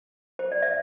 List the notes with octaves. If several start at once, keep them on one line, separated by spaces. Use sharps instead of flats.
C5
D5
E5